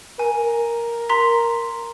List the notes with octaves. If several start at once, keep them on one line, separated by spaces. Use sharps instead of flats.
A#4 G#5
A#5 C6 B6